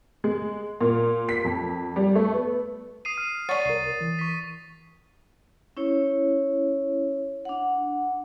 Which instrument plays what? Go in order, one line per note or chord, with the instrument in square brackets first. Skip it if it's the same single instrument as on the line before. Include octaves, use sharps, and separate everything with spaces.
[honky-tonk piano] G#3
A#2
B6
F2
G3
A3
B3
[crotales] D#6 C7 D#7
[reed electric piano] F6
[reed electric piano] C#5 C#6 [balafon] D5 F#5 [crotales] A6
[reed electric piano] C2 A#4 [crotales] C7
[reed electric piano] E3
[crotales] C#6 B6
[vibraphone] C#4 E4 C#5
D4 F#5